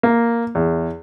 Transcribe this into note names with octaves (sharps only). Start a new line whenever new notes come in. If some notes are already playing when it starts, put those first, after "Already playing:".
A#3
E2